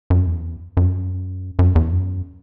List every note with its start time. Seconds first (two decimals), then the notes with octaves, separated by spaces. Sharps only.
0.10 F#2
0.27 E2
0.77 F#2
1.59 F#2
1.75 E2
1.92 F#2